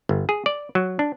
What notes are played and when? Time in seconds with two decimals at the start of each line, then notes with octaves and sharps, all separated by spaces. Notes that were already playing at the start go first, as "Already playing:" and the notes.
0.09 G1
0.29 G#4
0.46 D5
0.75 F#3
0.99 D4